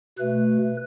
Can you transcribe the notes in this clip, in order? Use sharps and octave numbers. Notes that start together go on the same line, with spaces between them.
B2 A3 B4